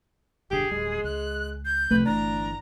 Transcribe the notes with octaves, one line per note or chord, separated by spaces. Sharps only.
E1 G2 D3 G4 G#4
D1 G3 G#3
C#2 F#6
G6
C2 C3 F3 A3 B4
G1 E3 D4 A#5